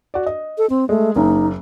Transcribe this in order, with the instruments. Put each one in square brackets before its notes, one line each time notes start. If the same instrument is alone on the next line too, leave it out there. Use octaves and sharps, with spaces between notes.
[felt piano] F#4 D5
D#5
[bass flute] A4
C4
[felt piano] G#3 [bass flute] A3
[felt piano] F#1 A#3 [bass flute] D#4